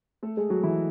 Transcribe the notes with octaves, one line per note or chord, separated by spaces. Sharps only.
A3 A4
G#3 G#4
F#3 F#4
E3 E4